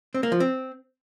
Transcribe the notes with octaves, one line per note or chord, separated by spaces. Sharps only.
C4
A#3
F3
C4